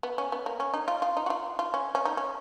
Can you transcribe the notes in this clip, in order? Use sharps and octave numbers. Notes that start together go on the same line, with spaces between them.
B3
C#4
B3
A#3
C#4
D#4
F4
F4
D#4
F#4
F4
F4
C#4
C#4
D#4
C#4